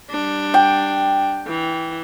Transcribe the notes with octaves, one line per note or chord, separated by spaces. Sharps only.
G3 D4
G5
E3